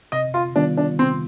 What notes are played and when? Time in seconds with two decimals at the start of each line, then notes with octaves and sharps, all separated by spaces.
0.12 C3 D#5
0.34 F4
0.56 D#3 G3 B3 D4 F4
0.77 D4
0.99 C3 C4